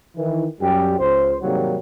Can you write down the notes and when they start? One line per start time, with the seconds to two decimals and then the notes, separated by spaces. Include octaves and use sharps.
0.17 D#3 E3
0.61 F#2 G3 G4
1.00 C#2 C5
1.41 G#2 C3 D#3 F#3 G3 A#3